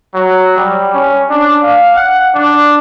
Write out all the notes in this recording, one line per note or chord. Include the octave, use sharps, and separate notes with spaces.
F#3
G3
C#4
D4
F5
F#5
D4